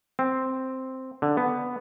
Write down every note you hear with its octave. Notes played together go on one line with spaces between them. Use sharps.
C4
D3
B3